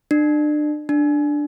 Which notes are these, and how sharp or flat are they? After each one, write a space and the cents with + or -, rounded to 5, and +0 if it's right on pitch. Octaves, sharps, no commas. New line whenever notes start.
D4 +35
D4 +5